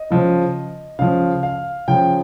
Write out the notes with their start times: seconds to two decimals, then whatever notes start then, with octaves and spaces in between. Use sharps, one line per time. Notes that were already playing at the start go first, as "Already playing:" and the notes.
Already playing: D#5
0.10 C#3 F3
0.99 C#3 F3 F5
1.43 F5
1.88 C#3 F3 G5